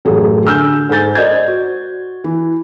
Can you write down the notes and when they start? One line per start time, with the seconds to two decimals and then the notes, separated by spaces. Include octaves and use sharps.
0.05 A1 F#2 A3 G#4
0.44 D3 G#5 E6 F6 G6
0.89 G#2 A4 G#5 G6 A6
1.15 C5 D5 D#5 G6 G#6
1.48 F#4
2.24 E3